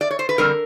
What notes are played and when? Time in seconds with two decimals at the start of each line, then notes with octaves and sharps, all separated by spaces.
0.01 D5
0.11 C#5
0.19 C5
0.29 B4
0.38 F2 D3 G3 C4 A#4